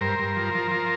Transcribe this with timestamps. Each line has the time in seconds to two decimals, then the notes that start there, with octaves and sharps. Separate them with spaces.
0.01 G2 A#4 C5
0.19 G2
0.36 F3
0.54 F3
0.71 F3